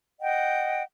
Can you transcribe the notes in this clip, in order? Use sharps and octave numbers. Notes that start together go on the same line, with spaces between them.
D#5 F#5 G5